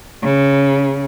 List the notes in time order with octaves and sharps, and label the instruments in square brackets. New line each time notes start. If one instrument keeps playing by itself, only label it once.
[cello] C#3